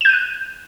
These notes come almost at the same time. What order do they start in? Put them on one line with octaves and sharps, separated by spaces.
E7 G6 D#7 F#6